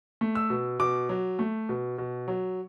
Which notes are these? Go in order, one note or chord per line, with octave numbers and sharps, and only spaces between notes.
A3
E6
B2
B2 D6
F#3
A3
B2
B2
F#3